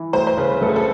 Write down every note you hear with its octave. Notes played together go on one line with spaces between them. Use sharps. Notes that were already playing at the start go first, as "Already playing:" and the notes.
Already playing: E3
D2 C5
C5
C#3 B4
D2 A4
G#4
A4